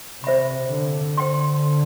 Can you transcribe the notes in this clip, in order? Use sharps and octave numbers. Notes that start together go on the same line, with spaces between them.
C3 C5 E5 B5
D3
D3 C5 G5 C6